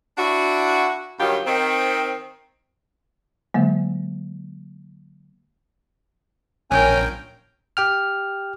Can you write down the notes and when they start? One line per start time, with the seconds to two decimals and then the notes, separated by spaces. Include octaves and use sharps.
0.18 D4 E4 F#4
1.19 G2 D#3 F#3 F4 G4
1.46 D#3 C4
3.54 D3 F#3 G#3 A#3
6.71 A#1 C#4 A#4 G5 G#5
7.77 G4 G5 F6